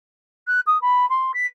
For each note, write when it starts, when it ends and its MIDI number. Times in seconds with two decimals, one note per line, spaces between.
0.48 0.61 90
0.67 0.80 87
0.82 1.08 83
1.10 1.32 84
1.34 1.47 95